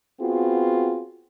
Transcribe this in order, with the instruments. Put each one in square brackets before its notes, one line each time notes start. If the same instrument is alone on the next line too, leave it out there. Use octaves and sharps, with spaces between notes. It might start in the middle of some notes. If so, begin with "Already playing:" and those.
[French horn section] B3 C4 F4 F#4 G#4